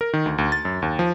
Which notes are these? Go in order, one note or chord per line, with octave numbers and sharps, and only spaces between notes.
A#4
D#3
D2
D2
A6
F#2
D#2
F3